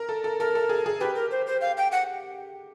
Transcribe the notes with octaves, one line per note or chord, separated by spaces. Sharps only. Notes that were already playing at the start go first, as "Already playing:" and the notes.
Already playing: A#4
A4
A4
A4 A#4
A4
G#4
G#4
G4 B4
A#4
C5
C5
F5
G5
F#5